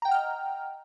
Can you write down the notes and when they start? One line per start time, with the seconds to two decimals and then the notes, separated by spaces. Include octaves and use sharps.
0.02 A#5
0.05 G5
0.08 F#5
0.11 F6
0.15 D#5